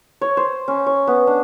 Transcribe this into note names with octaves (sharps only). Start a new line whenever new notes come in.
C#5
C5
C#4
C#5
B3
D4